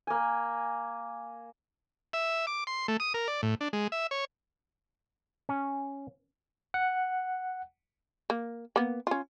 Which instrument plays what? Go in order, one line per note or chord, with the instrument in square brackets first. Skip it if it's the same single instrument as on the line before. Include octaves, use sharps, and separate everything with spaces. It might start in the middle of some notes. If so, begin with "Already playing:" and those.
[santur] A#3 G#5
[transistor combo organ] E5
D6
C6
A3
D#6
A#4
D5
A2
D4
G#3
E5
C#5
[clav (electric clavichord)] C#4
[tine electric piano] F#5
[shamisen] A#3
A#3 B3
C#4 F4